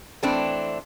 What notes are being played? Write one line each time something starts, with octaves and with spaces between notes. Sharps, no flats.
E3 A3 C4 D4